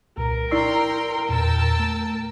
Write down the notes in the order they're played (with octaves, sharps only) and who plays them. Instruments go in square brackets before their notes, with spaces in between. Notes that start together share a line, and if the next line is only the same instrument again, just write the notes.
[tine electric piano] C2 A#2 [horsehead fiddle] A#4
[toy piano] E4 D5 C#6 [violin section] G5 A#5 C6 [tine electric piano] E6 C7
[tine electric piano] E2 A#2 [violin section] G5 A5 E6
[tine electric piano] A3